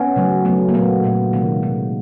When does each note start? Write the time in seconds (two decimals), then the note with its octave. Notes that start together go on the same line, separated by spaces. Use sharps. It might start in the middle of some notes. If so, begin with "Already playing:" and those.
Already playing: B3 C#4
0.16 C#3 F#3 A3
0.45 C#3 F#3 A3 B3
0.69 A#3
0.74 A#2 F#3 A3 B3
1.04 A#2 F#3 A3
1.33 C3 D#3 G#3 A#3
1.63 C3 D#3 G#3